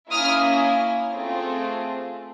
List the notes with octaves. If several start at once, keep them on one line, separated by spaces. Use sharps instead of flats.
A#3 C#4 E4 D#6 F6
A3 C4 F4 G#4